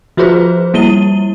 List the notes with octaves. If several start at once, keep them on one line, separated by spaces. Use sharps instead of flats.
F3 F4 F#4 G#4 B4 C5
G3 A#3 E4 D#7 G7